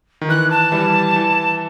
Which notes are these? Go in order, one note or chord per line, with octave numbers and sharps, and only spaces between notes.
D#3
E3 F#6
A5
E3 G3
E3